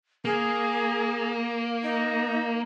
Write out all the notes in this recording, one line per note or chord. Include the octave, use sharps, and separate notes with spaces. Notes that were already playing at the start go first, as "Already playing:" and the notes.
A#3 G#4
D#4